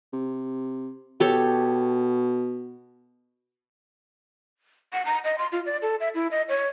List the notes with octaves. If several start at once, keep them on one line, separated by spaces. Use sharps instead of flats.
C3
B2 G4 A4 C#5
F#5
A#5
D#5
C6
F4
D5
A4
E5
E4
D#5
C#5